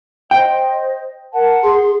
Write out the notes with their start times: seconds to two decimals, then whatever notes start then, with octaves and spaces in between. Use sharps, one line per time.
0.31 C5 D#5 G5
1.33 A#4 F#5 A5
1.64 G#4 C6